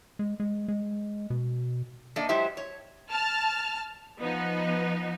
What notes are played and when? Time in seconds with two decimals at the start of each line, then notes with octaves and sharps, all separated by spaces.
0.19 G#3
0.40 G#3
0.68 G#3
1.30 B2
2.16 A#3 D4 A4 D#5 E5
2.29 F#3 G#3 E4 G4 C5 E5
2.57 C#5
3.10 A5 F6
4.21 F3 B3 D#4